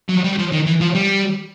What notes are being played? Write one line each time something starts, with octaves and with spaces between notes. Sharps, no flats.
F#3
G3
F3
D#3
E3
F3
G3